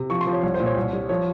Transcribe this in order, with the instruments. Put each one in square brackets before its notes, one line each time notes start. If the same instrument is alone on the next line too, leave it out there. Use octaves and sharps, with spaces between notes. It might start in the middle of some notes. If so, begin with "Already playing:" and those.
Already playing: [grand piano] C3
F3 C#6
C6
F3
C#5
C2 C#5
C5
A#2
C#5
C2
G3
F3 C#5